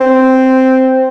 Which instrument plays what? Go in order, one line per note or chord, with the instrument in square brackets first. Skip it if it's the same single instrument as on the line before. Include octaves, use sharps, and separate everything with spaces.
[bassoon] C4